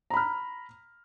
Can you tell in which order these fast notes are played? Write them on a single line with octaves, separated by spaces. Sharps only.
A#5 B5 F6